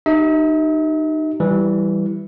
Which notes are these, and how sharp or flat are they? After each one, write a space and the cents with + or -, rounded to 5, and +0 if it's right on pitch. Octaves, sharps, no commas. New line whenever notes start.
D#4 -20 G4 -35 E5 -45
E3 +0 G3 -10